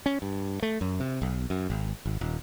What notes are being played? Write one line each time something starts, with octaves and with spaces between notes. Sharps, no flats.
C#4
G2
A3
F#2
C3
B1
F#2
G#1
G#1
D#1